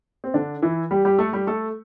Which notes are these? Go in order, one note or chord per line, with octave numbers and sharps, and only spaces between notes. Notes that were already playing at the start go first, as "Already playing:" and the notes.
C4
D3 D4
E3 E4
G3 G4
G3 G4
A3 A4
G3 G4
A3 A4